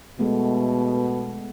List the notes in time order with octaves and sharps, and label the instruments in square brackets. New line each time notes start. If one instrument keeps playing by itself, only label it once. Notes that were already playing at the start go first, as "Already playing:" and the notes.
[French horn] B2 [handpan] G#3 A3 B3